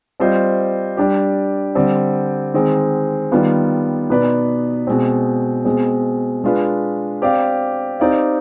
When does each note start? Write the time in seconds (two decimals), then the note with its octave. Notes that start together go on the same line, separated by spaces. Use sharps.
0.20 G3 C4 F4 C5 D#5
0.97 G3 D4 G4
1.75 D3 G3 C4
2.54 D#3 G#3 C4
3.32 D#3 G3 B3 F4
4.10 B2 B3 D#4 B4 D5
4.87 B2 G#3 C4
5.65 B2 G#3 C4
6.44 G#3 D4 F4 B4
7.22 C4 G4 D5 F5
8.00 C4 D#4 G4 D5 F5